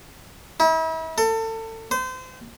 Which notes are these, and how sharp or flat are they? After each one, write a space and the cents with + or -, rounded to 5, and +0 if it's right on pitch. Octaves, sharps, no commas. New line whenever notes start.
E4 -40
A4 +30
C5 -30